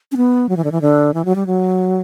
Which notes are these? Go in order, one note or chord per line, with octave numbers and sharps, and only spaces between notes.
C#4
B3
F#3
E3
D3
E3
D3
E3
F#3
G3
F#3